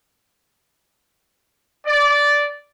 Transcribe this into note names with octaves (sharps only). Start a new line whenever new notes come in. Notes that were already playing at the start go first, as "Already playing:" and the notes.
D5